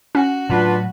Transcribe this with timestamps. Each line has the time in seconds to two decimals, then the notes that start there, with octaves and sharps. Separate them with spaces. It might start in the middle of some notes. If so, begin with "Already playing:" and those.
0.15 C#4 F#4
0.49 A2 F#3 D4 F4 B4